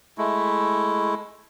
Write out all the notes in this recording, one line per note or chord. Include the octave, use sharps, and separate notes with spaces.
G#3 A3 E4